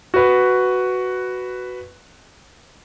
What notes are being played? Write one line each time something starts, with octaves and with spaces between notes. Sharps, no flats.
F#4 B4